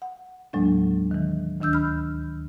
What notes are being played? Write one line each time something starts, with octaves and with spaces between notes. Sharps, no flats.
F#5
D#2 A2 F#3 G#3 A#3 D4
D#3 E3
D2 D#3 D4 E6 G6
B5 F6